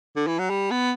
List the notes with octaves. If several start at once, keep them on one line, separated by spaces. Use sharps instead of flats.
D3
E3
F#3
G3
B3